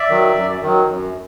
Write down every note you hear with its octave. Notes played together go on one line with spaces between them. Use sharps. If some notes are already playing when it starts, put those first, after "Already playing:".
Already playing: D5 E5
D#3 F#3
F#2
D#3 F#3
F#2